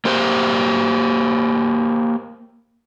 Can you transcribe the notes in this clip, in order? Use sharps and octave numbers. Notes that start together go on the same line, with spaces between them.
A#3 G4 C5